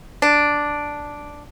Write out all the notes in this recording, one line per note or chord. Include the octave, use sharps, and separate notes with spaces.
D4